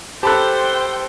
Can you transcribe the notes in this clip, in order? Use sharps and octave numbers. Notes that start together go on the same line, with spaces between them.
G4 A4 C5 G5 A5 B5 F#6